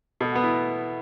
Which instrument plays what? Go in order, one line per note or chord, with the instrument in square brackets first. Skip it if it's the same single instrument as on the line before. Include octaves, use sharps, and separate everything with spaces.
[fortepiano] B2 [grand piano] A4
[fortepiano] B3 [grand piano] F#4
[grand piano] E4